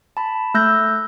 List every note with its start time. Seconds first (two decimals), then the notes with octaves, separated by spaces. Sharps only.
0.17 A5 B5
0.54 A3 E6 F#6 G6 A#6